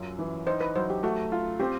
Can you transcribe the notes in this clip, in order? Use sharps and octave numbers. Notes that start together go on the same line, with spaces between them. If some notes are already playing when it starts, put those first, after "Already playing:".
Already playing: F#2 F#3 F4
E3
D#4 C5
B4
F#3 C5
G4
A3 F#4
F4
C4 G4